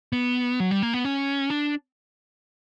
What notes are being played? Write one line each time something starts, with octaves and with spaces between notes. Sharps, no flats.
B3
F#3
G3
A#3
B3
C#4
D4